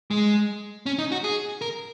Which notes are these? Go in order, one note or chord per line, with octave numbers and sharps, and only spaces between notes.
G#3
C#4
D#4
F#4
G#4
A#4